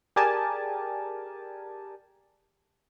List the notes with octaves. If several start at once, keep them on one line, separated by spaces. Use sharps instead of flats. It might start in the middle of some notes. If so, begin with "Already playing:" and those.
G4 G#4 A#4 D5 G#5 A5